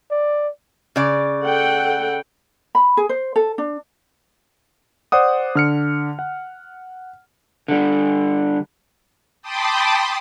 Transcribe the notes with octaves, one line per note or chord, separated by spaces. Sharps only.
D5
C#3 D5
A4 F#5 G5
B5
G#4
C5
A4
D4
C5 D5 F#5 D#6
D3 F6 C#7
F#5
D3 G3
G5 A5 B5 C6 D6 D#6